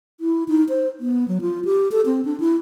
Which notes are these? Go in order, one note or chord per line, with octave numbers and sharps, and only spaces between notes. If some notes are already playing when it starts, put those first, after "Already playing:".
E4
D#4
C5
B3
F#3
F4
G4
A4
C4
D4
E4